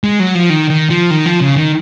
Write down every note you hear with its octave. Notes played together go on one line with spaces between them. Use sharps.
G#3
F#3
F3
D#3
D#3
F3
D#3
F3
C#3
D#3